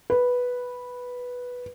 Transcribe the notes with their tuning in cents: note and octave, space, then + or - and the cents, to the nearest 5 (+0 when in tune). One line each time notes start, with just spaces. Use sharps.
B4 -5